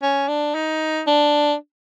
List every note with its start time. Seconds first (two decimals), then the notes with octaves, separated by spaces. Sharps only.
0.03 C#4
0.28 D4
0.55 D#4
1.07 D4